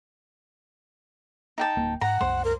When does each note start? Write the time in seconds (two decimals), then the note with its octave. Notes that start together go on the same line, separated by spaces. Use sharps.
1.58 D#4 G5 A5
1.77 D1 A#3
2.01 G#2 F#5 A#5
2.21 C2 F#2 G#3 C5
2.45 A#4